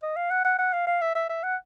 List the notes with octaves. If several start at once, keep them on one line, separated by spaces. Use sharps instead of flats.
D#5
F5
F#5
F#5
F#5
F5
F5
E5
E5
E5
F#5